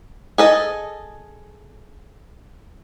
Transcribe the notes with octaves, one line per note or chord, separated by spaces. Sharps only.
G#4 A4 D#5